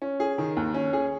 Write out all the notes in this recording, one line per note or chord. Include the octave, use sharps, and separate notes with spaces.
C#4
G#4
D#3
D#2
C#4
G#4